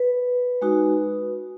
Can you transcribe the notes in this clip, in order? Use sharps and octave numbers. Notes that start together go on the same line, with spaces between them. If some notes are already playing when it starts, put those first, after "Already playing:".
Already playing: B4
G#3 D#4 F#4